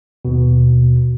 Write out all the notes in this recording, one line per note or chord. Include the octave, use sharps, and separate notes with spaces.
D#2 B2